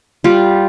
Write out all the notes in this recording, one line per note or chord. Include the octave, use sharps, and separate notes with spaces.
G3 F4